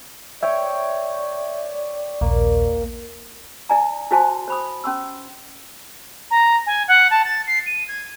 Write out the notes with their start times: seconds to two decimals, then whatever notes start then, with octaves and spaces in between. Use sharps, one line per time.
0.43 C#5 D5 E5 G5
2.21 A#1 D#2 A#3
3.69 E4 D5 G#5 A#5
4.11 E4 F#4 C5 G#5 A5 C6
4.48 C5 B5 D#6
4.84 C#4 C6 E6
6.31 A#5
6.66 G#5
6.88 F#5
7.11 A5
7.25 A6
7.47 C7
7.66 D#7
7.88 G#6